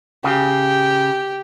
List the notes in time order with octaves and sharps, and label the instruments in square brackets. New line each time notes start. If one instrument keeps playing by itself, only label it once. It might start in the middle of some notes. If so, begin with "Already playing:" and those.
[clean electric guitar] C#3 [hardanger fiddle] G4